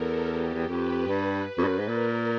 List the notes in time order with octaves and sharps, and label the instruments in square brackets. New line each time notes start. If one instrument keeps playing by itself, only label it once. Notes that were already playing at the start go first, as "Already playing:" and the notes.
Already playing: [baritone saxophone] E2 [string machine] A4 A#4
[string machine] G4
[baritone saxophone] E2
[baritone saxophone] F2 [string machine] B4
[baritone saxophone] G2
F2
G2
F#2
G#2
[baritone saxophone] A#2 [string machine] A#4